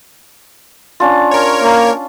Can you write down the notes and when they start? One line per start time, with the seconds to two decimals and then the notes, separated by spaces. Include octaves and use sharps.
1.00 C#4 D4 F4
1.31 A#4 C#5
1.62 A#3